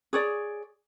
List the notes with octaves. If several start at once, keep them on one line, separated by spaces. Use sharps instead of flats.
G#4 C#5 D5